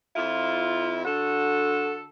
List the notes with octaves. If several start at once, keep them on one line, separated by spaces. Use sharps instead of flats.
F2 E4 F4
D3 F#4 A4